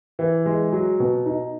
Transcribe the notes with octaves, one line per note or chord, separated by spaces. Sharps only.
E3
G#3
F#3
B2
D#4